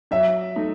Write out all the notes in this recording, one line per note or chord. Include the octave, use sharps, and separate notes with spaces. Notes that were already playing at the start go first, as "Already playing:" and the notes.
F#3 E5
A3 D#4